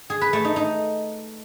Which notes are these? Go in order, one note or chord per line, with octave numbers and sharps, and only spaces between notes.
G#4
B4
A3
D#4
D#4